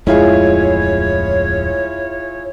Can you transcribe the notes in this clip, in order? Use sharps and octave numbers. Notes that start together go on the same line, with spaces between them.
D1 F2 G#3 E4 F4 G#4 C#5